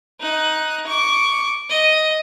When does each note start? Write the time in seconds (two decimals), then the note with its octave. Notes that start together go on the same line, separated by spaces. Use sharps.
0.20 D#4 F#6
0.87 C#6 D6
1.70 D#5